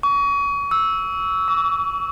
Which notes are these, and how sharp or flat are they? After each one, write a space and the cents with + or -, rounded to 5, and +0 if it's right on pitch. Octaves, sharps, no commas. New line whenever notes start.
C#6 +35
E6 -10
D6 -45